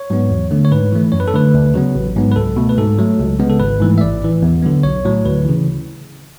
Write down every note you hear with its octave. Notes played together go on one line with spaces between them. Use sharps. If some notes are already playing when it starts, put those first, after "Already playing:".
Already playing: C#5
G#2 F#3 B3
E2
D3 A3
C#5
G#2 B4
E3 A3
F#2 C#5
B4
A4
D3 A3 B4
D2
C#3 F#3 B3
A1
G#2 F#3 B3
B4
C#2 A4
B2 A3
B4
G#2 A4
F#3 A3
C#2
C#3 G#3 B3
A4
G#1 B4
G#2 E3 A3
E5
A1 D5
A2 E3
E2
D3 F#3 B3
B1 C#5
A2 F#3
D2 B4
C#3 E3